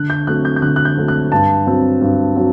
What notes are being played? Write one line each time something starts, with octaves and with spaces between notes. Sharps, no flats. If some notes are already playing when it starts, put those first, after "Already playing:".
Already playing: D3 F#6
G6
F#3 A3 C4 F#6
G6
G6
D3 F#6
F#6
G6
F#3 A3 C4
F#6
G2 A5
F#3 C4
G2
F#3 C4